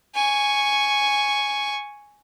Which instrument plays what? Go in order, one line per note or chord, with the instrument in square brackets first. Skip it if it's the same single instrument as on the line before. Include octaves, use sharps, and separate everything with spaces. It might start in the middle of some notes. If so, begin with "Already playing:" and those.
[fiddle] G#5 C#6